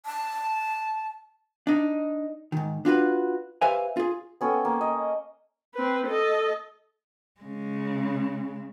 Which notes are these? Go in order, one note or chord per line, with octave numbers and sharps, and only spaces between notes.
A5
D4 D#4
G#2 D#3
D4 F4 F#4 B4
G4 B4 C5 E5 F5 G#5
F4 G#4
B3 C#4 A4 G5
A#3
D#5
C4 B4
A4 D#5
C#3 G#3